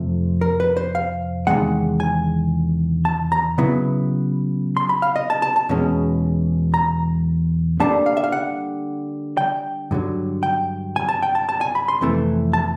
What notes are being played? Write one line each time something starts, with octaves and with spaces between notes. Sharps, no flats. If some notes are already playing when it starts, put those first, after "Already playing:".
Already playing: F2 C3 F3 A3
A#4
B4
C5
F5
E2 C3 D#3 G#3 F#5
G#5
A5
A#5
C#3 F#3 B3 E4
C6
B5
F5
D#5
A5
A5
A5
E2 B2 G#3 C#4
A#5
D3 G3 A#3 D4 A5
F5
E5
F5
F#5
G5
G2 D3 F#3
G5
G#5
A5
G5
A5
A5
G#5
B5
C6
F2 C3 E3 A3
A5